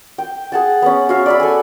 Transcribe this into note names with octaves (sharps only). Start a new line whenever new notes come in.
G5
G#4 F#5 A5
B3 C#4
F#4 C#5 E5 F5
D5 E5 B5
A4 G#5